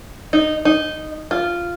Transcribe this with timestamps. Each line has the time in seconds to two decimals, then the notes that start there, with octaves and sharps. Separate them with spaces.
0.33 D#4
0.65 D#4
1.31 F4